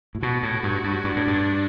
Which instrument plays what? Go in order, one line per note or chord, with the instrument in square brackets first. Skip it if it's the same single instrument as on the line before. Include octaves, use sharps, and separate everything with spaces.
[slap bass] A2
[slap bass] B2 [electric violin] F#4
[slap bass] A2
G2
G2
[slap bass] G2 [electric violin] D4
[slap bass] A2
G2